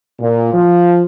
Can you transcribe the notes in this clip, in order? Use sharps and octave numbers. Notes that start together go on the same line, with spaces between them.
A#2
F3